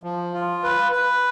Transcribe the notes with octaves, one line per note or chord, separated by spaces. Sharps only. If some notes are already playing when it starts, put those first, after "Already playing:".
F3
F4
B4
B4